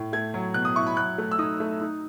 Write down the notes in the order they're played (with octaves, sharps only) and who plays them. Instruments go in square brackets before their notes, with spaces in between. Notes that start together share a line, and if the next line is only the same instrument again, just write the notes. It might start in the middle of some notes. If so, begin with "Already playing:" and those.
Already playing: [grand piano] A2
A3 G#6
F#3
B2 F#6
D#6
E4 C#6
B5
F#3 F#6
A3
E6
D#4 D#6
A3
D#4